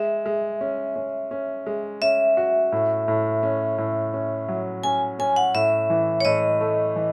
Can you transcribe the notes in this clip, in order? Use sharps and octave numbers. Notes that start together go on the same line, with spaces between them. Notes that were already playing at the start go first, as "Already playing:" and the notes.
Already playing: G#3 E5
G#3
C#4
C#4
C#4
G#3
C#4 E5
F#4
A2
A2
C#4
A2
C#4
F#3
C#4 G#5
C#4 G#5
F#5
A2 E5
E3
C#5
A2 D#5
A3
E3